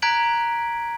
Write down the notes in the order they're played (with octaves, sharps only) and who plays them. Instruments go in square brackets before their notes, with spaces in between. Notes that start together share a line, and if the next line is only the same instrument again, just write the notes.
[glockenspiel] A#5 F#6 G#6 B6 D7 F#7